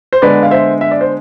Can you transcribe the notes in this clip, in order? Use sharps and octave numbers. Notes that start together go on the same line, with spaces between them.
C5
D3 G#3 B3 B4 D5
F5
C5 E5
E5
D5
C5